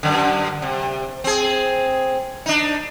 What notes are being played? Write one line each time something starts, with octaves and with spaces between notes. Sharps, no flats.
F#2 D3
C3
C4 G#4
D4 D#4